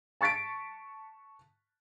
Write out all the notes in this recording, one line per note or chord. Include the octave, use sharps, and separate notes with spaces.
A5 C#6 A6 B6 D7